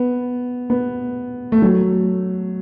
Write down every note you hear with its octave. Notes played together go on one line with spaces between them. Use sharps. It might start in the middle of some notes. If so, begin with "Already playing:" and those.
Already playing: B3
B3
A3
F#3